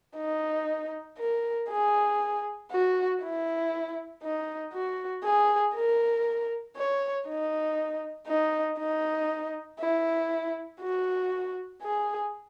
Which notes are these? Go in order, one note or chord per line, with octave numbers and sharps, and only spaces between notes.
D#4
A#4
G#4
F#4
E4
D#4
F#4
G#4
A#4
C#5
D#4
D#4
D#4
E4
F#4
G#4